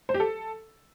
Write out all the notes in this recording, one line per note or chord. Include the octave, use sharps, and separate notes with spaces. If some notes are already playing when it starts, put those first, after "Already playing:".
C5
G4
A4